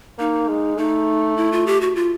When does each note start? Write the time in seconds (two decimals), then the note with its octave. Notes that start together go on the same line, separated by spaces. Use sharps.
0.18 A#3 D#4
0.48 G#3
0.78 A3 D#4
1.37 E4
1.52 F4
1.67 G4
1.81 F#4
1.96 F4